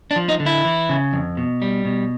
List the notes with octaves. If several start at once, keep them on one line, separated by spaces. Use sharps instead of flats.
D4
F3
D#4
D3
E4
E3
C#3
F2
B2
G3
B2